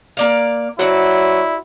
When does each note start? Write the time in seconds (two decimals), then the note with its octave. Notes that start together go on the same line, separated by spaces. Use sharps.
0.17 A#3 D5 F5
0.79 F#3 E4 F#4 C5 D5